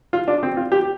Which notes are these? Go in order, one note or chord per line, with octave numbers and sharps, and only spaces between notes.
F4
D4
C4
F4
G4